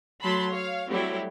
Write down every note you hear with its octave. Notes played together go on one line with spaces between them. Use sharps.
F#3 A3 A5 B5 C6
C#5 F5
F#3 G3 A3 C4 E4 G4